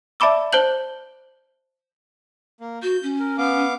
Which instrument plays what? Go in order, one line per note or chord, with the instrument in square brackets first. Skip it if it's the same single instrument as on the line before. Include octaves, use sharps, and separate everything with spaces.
[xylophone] D5 E5 A5 B5 D6 E6
C5 A5 F#6 G6 F#7
[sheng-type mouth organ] A#3
[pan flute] F#4 [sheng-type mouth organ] G6
[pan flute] C#4
[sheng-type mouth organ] A#4
B3 F5 D6